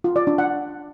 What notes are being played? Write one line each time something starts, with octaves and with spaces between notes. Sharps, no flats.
F4
D5
D4
F#5